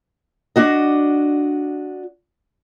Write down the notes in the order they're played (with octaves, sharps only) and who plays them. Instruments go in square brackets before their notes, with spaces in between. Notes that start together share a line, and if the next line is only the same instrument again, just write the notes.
[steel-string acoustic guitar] D4 F#4 D#5